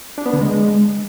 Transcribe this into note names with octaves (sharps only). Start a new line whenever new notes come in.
D4
B3
D3
G#3